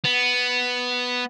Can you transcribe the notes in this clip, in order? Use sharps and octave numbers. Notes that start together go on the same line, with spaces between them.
B3